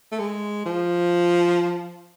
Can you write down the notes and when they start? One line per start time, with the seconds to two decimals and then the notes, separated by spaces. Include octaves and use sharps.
0.12 A3
0.19 G#3
0.66 F3